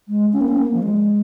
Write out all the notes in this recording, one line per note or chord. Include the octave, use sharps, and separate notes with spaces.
G#3
C#4
A#3
C#4
A#3
F3
G#3